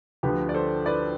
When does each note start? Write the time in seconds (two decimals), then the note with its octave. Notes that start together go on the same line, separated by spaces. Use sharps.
0.23 D2 D3 F3 G4 B4
0.49 D5
0.54 A4 C5
0.86 B4 D5